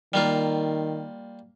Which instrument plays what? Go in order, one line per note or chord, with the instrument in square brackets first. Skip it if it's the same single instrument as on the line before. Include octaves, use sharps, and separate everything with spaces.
[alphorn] D#3 [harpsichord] G3 A#3 F4